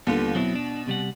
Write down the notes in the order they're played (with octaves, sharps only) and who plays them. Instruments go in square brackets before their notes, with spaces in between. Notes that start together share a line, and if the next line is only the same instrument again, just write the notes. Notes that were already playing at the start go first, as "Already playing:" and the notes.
[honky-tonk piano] D#2 D3 [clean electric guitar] G3 B3 F4
[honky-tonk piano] B2 [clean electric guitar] F#3 C4 E4
[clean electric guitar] D4
C3 G3 F#5